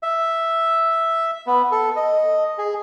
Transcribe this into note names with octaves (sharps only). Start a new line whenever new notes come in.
E5
B3
A4
D#5
G#4